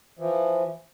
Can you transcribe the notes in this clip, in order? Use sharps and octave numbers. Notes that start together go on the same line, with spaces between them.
E3 F3